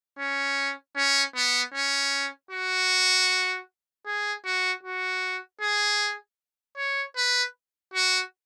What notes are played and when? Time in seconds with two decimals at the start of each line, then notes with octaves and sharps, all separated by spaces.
0.19 C#4
0.96 C#4
1.35 B3
1.74 C#4
2.51 F#4
4.06 G#4
4.45 F#4
4.83 F#4
5.61 G#4
6.77 C#5
7.16 B4
7.94 F#4